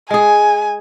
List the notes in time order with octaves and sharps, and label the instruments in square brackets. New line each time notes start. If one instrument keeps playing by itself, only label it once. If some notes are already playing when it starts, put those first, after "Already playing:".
[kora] G#3 G#4 [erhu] G#5